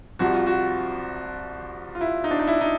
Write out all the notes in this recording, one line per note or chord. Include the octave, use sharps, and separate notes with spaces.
C2 C3 F3 F#4
F4
F#4
F4
E4
D#4
D4
D#4
E4
D#4